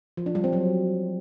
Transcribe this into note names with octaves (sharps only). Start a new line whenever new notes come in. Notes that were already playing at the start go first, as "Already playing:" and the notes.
F3
D4
G3
C4
F#3